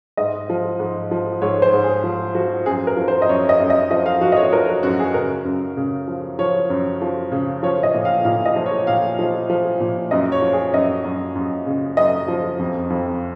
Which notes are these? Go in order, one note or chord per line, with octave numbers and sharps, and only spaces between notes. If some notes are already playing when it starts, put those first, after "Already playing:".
G#2 D#5
F3
G#2
F3
G#2 C#5
C5
G#2
G#4
F3
F3 F#4
F#2 G#4
A#4
F3
C5
D#5
F#2 C#5
D#5
F#2
D#5
F3 D#5
F5
F3 F#4
D#5
C#5
F3 A#4
F#4
F#2 F#4
G#4
C#3 A#4
F#2
C#3
F3
F3 C#5
F#2
F3
C#3
F3 C#5
D#5
A#2
F5
A#2 F5
D#5
F3
C#5
A#2 F5
F3
F3
A#2
F#2 D#5
C#5
F3
G#4
F#2 D#5
F#2
F#2
C#3
F#2 D#5
F3
F2
F2